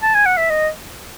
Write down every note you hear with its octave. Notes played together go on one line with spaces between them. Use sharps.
A5
G#5
F#5
E5
D#5